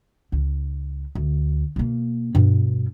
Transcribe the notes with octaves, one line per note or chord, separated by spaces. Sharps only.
C#2
D2
B2 A#3
G2 B2